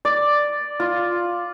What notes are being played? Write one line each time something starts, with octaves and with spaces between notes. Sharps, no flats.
D5
F4